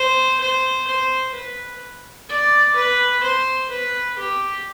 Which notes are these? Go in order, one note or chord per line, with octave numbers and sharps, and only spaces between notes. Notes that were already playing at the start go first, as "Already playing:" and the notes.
Already playing: C5
C5
C5
B4
D5
B4
C5
B4
G4